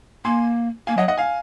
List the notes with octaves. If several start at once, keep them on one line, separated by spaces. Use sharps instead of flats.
A#3 G#5 C6
A#3 F5 G#5
F#3 D#5 F#5
D#5 F#5
F5 G#5